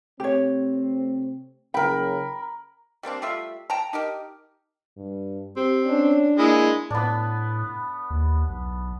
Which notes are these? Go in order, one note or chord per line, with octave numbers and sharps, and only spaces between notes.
C3 A3 C4 G4 C#5
F#1 C#3 A#4 G5 B5
G3 A#3 C4 D4
G3 A3 F4 E5
G5 A5 A#5
D#4 G4 A#4
G2
C4 G4
C#4 D4
G#3 A#3 E4
A2 B3 D4
D#2
B1